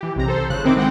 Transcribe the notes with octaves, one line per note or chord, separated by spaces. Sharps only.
E3 G4
B1 C3 A#5
A4 C5
G1 C#3 F#6
D#3 C4 E4 D6
G#3 C4 F#5 G5